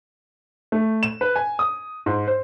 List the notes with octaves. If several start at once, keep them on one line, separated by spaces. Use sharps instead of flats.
A3
E7
B4
G#5
D#6
G#2
C5